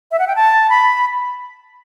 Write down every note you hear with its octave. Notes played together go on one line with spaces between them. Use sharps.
E5
F#5
G5
A5
B5